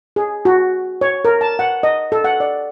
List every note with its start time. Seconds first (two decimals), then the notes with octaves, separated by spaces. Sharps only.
0.16 G#4
0.45 F#4
1.01 C#5
1.25 A#4
1.41 A5
1.59 F#5
1.83 D#5
2.12 A4
2.24 F#5
2.40 D5